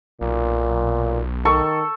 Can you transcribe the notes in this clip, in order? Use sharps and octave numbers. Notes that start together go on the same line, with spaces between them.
B1 A#2
D#3 A4 C#6